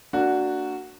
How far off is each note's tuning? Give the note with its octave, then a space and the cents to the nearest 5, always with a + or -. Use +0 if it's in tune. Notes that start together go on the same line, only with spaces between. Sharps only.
A#3 -30 D4 +0 F#4 +0